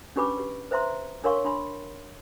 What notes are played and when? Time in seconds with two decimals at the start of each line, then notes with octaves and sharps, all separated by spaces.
0.16 C#4 D4 G4 B4 B5 D6
0.37 G4 B4
0.71 B4 C5 E5 A#5 C6
1.24 D4 A#4 C#5 F5 C6 C#6
1.44 D4 B5 C6